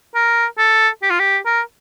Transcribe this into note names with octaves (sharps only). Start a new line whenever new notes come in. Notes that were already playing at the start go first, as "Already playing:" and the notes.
A#4
A4
G4
F4
G4
A#4